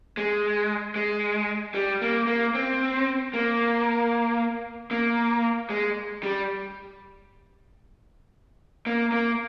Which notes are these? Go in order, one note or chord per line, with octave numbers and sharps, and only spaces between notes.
G#3
G#3
G3
A#3
A#3
C4
A#3
A#3
G#3
G3
A#3
A#3